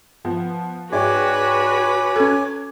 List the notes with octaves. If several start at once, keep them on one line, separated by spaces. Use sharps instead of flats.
F3 B3
G#2 F#4 B4 C#5 D5 G5 G#5 D6
C#4 A4 G#6